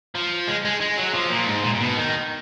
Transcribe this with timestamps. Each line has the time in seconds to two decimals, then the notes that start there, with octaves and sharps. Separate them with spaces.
0.15 F3
0.48 G#3
0.65 G#3
0.81 G#3
0.97 F#3
1.14 F3
1.30 A#2
1.47 G#2
1.64 A#2
1.75 A#2
1.80 B2
1.97 D#3